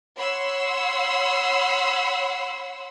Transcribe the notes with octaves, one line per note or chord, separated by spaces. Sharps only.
C#5 F#5 B5 C6 E6